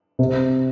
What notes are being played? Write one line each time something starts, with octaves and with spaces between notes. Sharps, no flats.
C3